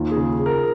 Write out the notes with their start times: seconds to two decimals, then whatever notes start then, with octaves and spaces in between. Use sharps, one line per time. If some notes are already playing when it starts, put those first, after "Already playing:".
Already playing: D#2 F4
0.11 G#4
0.17 C#3
0.39 C#3
0.46 A#4